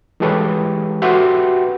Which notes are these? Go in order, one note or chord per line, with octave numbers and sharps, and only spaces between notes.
E3 G#3 G4 A4 B4 C#5
F#4 G4 B4 E5 G5 C6